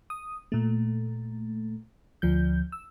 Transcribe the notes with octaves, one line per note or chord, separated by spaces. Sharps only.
D#6
A#2 A3
D2 F3 G6
E6